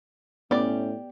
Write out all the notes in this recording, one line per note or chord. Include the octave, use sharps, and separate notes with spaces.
A2 B3 C#4 G4 D5